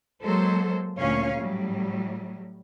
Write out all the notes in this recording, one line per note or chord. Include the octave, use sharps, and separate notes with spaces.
F#3 G#3 A#3 A4 C5
D2 A#2 C#4 C#5 F5
A2 F#3 G3